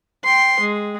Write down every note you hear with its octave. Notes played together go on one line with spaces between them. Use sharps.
G5 C6
G#3